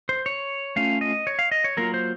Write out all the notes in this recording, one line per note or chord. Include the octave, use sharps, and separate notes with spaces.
C5
C#5
A3 C#4 F4 F5
D#5
C#5
F5
D#5
C#5
F#3 A#3 F4 A#4
C5